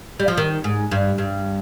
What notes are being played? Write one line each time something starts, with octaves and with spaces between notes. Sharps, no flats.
G3
F3
D#3
G#2
G2
G2